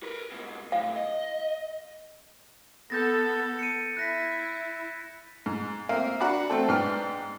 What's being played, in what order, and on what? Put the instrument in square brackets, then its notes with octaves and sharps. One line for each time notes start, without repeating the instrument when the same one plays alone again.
[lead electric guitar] A#4 B4
G#2 B2
[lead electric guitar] C#2 A2 [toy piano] F5
[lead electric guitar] D#5
[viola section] B3 A4 [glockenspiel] G6 A6 A#6
[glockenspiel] C#7 D#7
[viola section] E4 [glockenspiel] F#6 A#6 B6
[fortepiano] G#2
A#3 C4 A#4 E5 F5
D4 F#4 F#5 A#5 B5 D6
A3 C4 A4
G#2 B3 D4 G5 F6